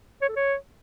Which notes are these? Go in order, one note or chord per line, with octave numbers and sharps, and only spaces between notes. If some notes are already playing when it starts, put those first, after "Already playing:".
C#5
A4
C#5